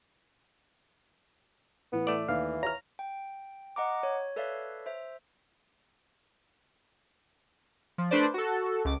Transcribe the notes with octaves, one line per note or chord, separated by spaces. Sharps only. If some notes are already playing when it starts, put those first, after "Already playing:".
A2 E3 B3
A3 D5
D#2 E3 F5
C#5 A#5 F6
G5
D#5 F#5 A#5 D6
C#5
A4 B4 C#5 D5 E5 F5
C5 E5
F3
A3 D4 B4 C5 D5
F#4 A4
C#2 D6